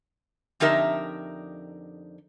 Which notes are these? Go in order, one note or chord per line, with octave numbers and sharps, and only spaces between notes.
F2 D3 D#4 G4 A#4 E5